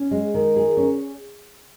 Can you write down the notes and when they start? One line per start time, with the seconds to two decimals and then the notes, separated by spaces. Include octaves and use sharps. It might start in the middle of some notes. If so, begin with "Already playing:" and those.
Already playing: C#4
0.11 G#3
0.34 D#3
0.56 G#4
0.77 C#4